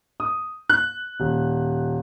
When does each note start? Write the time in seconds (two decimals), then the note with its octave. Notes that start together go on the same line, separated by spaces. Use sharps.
0.20 D#6
0.69 F#6
1.20 D#1